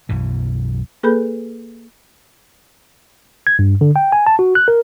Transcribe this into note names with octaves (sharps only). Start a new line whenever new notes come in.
B1 F#2 B2 E3
A#3 G#4 A4 B4 B5 G6
G#6
G2
D3
G5
G#5
A5
F#4
F#6
A#4